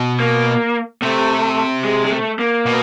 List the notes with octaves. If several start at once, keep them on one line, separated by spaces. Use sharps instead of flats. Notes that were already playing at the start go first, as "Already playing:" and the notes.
Already playing: B2
A#3
C3 A3
G#3
G#3
A3
A#3
B2